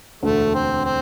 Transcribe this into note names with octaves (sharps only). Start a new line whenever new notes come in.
E1 D2 D3 A3
C4
C4